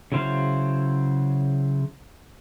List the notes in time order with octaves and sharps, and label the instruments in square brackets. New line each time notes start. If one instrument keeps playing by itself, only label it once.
[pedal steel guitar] C#3 F#3 E4 C5 F5